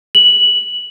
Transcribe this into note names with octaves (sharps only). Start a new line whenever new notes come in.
F#7